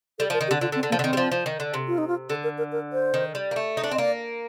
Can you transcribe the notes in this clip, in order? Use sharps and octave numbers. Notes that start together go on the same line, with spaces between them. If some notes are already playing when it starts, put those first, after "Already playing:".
G3 A4
F3 A#4
D#3
G4
D3
D3 F4
D3
C4
D3
A#3
F3
D3
D#3 C4
G3
F3
F3
D#3
D3
C3
F4
D#4
F4
D3 A4
A#4
A#4
A#4
C5
D#3
G3
A#3
A3
D#4
D4
C4 D#5
A#3 D5